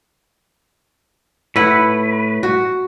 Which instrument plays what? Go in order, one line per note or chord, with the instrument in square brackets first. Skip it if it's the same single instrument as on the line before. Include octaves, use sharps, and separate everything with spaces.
[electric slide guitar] A2 B4 [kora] E4 F#5
[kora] F#4